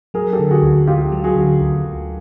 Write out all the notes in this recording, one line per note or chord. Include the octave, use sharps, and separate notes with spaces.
F#3 G#4 A#4
G4 A4
D3
F#4 G#4
D2
D2 F4 G4
F#3
F#4 G#4
D3
D2
D2